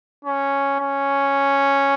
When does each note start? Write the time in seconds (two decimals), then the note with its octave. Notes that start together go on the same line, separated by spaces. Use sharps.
0.25 C#4
0.80 C#4